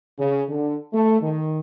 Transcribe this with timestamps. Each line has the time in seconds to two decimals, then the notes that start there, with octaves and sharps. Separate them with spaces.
0.19 C#3
0.50 D3
0.93 A3
1.22 D#3